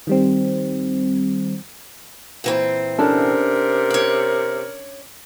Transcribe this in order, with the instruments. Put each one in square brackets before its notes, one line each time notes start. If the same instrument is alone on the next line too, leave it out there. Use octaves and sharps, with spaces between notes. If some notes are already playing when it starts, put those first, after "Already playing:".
[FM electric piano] D#3 G3 C4
[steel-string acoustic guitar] A#2 E3 C4
[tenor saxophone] C3 [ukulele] C#4 D4 A4 [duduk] A#4
[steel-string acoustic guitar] C#5 D5